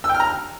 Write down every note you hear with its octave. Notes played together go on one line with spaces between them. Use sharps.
E6
G5
F6
A#5
F6